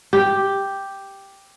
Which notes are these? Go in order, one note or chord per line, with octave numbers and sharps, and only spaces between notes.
G4